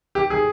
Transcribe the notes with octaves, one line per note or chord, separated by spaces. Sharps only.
G4
G#4